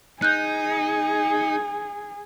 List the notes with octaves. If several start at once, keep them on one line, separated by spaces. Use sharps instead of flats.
D#4 G#4 F#6 G6